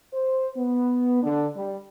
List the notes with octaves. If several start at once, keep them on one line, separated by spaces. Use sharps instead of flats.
C5
B3
D3
G3